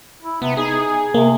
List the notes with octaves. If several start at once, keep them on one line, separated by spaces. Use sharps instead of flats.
E4
C3 B3
D#4 G#4
C3 A#3